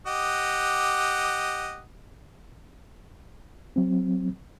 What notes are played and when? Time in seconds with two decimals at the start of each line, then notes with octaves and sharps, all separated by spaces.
0.07 G4 D#5 F#5
3.76 F#3 C4